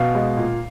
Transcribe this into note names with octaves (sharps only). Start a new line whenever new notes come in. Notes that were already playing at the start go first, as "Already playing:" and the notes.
Already playing: B2 F5
G#3
A#2